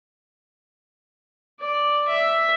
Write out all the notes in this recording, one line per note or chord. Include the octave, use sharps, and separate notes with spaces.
D5
E5